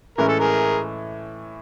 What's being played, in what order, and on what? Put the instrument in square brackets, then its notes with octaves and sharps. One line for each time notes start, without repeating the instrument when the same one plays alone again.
[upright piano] A2 E3 G#3 C#4 E4 [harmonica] A#4
[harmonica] A4
G#4 A#4